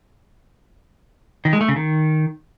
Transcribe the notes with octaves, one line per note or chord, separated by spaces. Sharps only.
D#3
G#3
A3
C#3
D#3